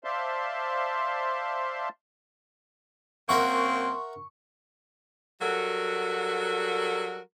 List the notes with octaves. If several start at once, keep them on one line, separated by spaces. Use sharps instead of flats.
C5 D5 E5 F5 A5 C6
F#2 A#3 C4 A#4 E5 F#5 C6 C#6
F#3 G3 F#4 A4 A#4